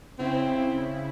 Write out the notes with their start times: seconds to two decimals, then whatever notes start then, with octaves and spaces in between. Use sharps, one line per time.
0.19 C#3 C4 E4